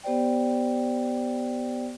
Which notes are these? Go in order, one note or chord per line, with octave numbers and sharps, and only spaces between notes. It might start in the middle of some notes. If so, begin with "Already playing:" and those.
B3 G4 C5 D5 G5